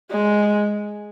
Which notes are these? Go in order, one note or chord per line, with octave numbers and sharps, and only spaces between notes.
G#3